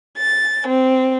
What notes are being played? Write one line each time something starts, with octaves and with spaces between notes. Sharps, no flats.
A6
C4